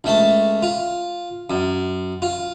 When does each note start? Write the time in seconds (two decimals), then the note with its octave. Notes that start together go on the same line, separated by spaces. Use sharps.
0.04 C#2 A3 A5
0.63 F4
1.50 F#2
2.22 F4